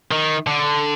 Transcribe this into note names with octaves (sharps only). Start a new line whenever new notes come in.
D#3
D3